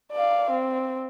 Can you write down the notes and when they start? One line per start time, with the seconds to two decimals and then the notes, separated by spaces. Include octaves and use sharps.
0.12 D5 F5
0.50 C4